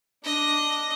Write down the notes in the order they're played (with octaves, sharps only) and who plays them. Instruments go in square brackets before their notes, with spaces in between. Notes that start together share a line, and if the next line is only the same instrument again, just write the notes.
[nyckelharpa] D4 [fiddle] D#5